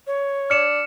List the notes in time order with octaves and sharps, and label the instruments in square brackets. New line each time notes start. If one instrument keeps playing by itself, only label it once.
[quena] C#5
[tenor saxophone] D4 [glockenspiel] F6 C#7 E7